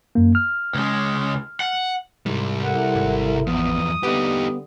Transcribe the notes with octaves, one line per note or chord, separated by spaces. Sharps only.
F#2 A#3
F6
C#2 G#3
F#5
C2 G#2 G3
E4 A4 A#4 F#5
G#1
E2 F3 B3 D#6
D3 G3 B3 D#4 G4